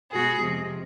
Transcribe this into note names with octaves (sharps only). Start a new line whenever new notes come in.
B2 G#3 B3 F#4 G#4
F2 C3 F3 G#3